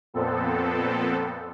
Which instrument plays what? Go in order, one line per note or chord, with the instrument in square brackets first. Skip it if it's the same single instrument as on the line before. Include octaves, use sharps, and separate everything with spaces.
[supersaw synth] F2 A#2 B3 C4 A4